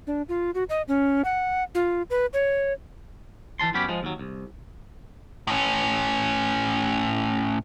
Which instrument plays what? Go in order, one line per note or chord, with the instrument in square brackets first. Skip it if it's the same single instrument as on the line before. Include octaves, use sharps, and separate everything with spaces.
[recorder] D4
F4
F#4
D#5
C#4
F#5
F4
B4
C#5
[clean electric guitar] E3 F3 A5 C6
F#2 B3 C#4 G4 B5
F3 G#3
D#2 F#3
C2
[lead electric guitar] A2 C#4